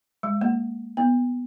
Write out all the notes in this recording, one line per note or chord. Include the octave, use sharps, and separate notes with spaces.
G#3
A#3
B3